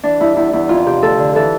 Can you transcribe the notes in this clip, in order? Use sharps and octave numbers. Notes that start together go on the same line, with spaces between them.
E3 D4
G2 E4
E2 E4
E2 E4
F2 F4
C3 G4
D2 A4
D3
E3 A4